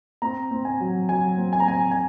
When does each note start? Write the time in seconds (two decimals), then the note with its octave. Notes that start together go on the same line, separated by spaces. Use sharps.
0.22 C4 A#5
0.51 C4
0.65 G#5
0.80 F#3
1.09 F#3 G#5
1.38 C4
1.53 G#5
1.60 A#5
1.66 C4 G#5
1.91 G#5